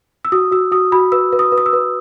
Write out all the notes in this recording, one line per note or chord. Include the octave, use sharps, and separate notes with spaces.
E6
F#4 D#6
F#4 E6
F#4 D#6
F#4 B5
B4 E6
B4
D#6
B4
D#6
E6
B4